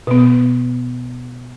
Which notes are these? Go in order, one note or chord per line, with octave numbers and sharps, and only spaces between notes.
B2 B3